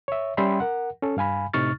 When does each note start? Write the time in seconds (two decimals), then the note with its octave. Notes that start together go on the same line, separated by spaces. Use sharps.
0.08 C#5 E5
0.37 G3 C#4 E5 G5 B5 C6
0.60 A#4 F#5
1.03 C#4 A4
1.17 G2 F5 G#5 B5
1.54 A2 C3 D#4 C#6 F6 A6